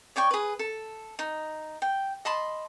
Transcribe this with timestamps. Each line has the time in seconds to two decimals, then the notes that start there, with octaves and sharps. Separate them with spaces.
0.16 C#5 D5 G5 C#6
0.31 G#4 B4
0.59 A4
1.19 D#4
1.82 G5
2.25 D#5 A5 B5 C6